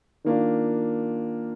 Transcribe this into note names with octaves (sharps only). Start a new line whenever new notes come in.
D#3 A#3 D4 F4